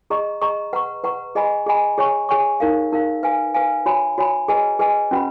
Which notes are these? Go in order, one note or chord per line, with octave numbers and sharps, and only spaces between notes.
G#4 D#5 A#5 C#6
G#4 D#5 A#5 C#6
B4 F#5 A#5 C#6
B4 F#5 A#5 C#6
G#4 D#5 G#5 B5
G#4 D#5 G#5 B5
G#4 C#5 G#5 C#6
G#4 C#5 G#5 C#6
D#4 A#4 F5
D#4 A#4 F5
B4 F5 G#5
B4 F5 G#5
F#4 C#5 G#5 B5
F#4 C#5 G#5 B5
G#4 B4 D#5 G#5
G#4 B4 D#5 G#5
C#4 F#4 B4 F#5 B5